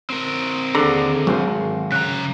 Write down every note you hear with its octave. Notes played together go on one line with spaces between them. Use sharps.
C4 A#4
D#2 D3 G#4 A#5
G#1 F#3 C5
C#3 A#5 F#6